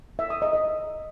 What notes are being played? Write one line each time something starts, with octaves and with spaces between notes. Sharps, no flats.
E5
D#6
D#5
D#5